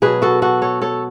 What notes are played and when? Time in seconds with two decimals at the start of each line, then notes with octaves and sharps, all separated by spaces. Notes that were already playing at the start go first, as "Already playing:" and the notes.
0.02 B2 F#3 G#4 B4
0.22 F#4 A4
0.42 F#4 A4
0.62 A4 C#5
0.82 A4 C#5